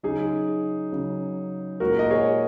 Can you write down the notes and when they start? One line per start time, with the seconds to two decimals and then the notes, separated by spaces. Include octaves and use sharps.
0.03 C#3 F#3 D#4 G#4
0.92 C#3 F#3
1.80 A#2 G#3 F#4 A#4
1.99 D#5
2.10 G#4 C#5